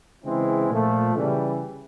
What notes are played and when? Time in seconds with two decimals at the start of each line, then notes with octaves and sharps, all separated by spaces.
0.24 C#3 E3 G#3 C4 E4
0.70 A#2 F3 A3
1.15 C#3 E3 G3